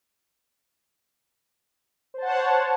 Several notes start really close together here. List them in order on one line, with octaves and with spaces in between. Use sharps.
C5 A5 F#5 C#5